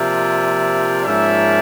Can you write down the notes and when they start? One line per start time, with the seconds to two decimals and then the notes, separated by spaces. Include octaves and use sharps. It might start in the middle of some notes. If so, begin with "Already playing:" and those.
Already playing: C3 F3 A#3 D5 E5
1.05 G#2 F3 A#3 C#4 D5 E5